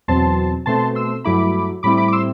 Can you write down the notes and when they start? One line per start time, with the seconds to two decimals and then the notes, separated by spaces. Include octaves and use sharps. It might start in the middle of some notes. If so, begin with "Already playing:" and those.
0.08 E2 B2 F#3 C4 A5 C6
0.66 B2 A3 C4 A5 C6
0.95 C6 E6
1.24 G2 F#3 A3 E4 B5 D6
1.83 A2 G3 C4 E4 B5 D6
1.97 B5 D6
2.08 D6
2.12 C6 E6